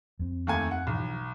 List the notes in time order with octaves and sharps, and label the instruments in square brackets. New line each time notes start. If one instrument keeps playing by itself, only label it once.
[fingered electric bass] F2 C4
[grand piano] D#2 A3 G#5
F#5
[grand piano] B1 [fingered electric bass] E3 F3